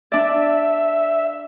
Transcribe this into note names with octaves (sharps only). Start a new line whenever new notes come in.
D4 D5 E5